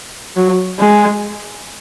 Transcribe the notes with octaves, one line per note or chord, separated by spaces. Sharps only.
F#3
G#3